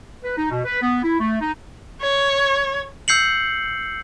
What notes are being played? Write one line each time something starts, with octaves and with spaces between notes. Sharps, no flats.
B4
D#4
B2
B4
B3
E4
A3
D#4
C#5
E6 G6 C7 C#7 F#7